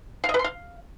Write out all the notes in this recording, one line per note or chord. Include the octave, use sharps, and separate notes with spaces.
F5
D#5
B4
C6
F5